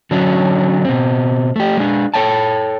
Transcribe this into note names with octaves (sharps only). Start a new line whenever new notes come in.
D3 F#3 C#4 D4
B2 C4
A3 G4
G#3 D4
A4 A#4 C#5 G5 A5